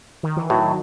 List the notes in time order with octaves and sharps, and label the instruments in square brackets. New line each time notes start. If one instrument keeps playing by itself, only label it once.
[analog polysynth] D#3
E3
[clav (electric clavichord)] A2 [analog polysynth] D#3 F#3